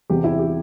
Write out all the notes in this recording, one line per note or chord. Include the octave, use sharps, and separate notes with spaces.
E2 C3 E3 G4
E4
G4